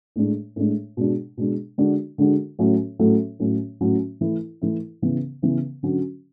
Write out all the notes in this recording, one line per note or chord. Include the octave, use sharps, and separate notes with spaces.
A2 G#3 D4
A2 G#3 D4
B2 G#3 D4
B2 G#3 D4
D3 G#3 D4 F#4
D3 G#3 D4 F#4
A2 F#3 A3 C#4
A2 F#3 A3 C#4
A2 F#3 C#4
A2 F#3 C#4
E3 A3 E4
E3 A3 E4
C#3 E3 B3
C#3 E3 B3
D3 F#3 C#4 F#4